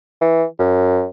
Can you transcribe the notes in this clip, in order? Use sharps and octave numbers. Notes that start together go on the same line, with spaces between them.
E3
F#2